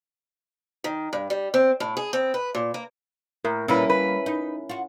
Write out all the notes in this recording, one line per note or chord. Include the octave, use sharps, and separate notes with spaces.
D#3
G2
G3
C4
A2
G#4
C4
B4
A#2
A#3
A2 A#4
A#2 G3 A#3 C#4 E4 B4
B4
D#4
F4 F#4